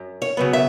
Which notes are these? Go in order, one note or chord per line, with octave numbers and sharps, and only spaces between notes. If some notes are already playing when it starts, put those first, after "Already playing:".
Already playing: F#2
C#5
C#3 F#3 B3
E5